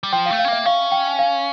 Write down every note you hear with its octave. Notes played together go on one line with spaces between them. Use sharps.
G3
F3 G5
F5
A3
F5
C#4
A#3 E5
C#4 F5
G5
F5